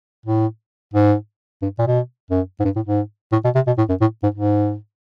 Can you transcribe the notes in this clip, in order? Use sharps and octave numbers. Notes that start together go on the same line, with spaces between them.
A2
G#2
G2
A#2
B2
F#2
G#2
G2
A2
G#2
A2
B2
C3
B2
A2
F#2
A2
G#2
G#2